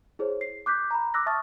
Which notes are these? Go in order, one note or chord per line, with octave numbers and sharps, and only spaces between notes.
E4 G#4 C5 C#5
C7
D6 F#6 G6 B6
A#5 B5
D6 E6 F#6 A#6
E5 A5 C#6 D#6 F6 A6